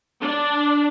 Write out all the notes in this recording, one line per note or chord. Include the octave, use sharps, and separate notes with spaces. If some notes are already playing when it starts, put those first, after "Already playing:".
D4